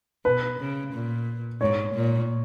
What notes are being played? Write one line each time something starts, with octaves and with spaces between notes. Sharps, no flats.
B2 B4
C#3
A#2
G#2 C#5
A#2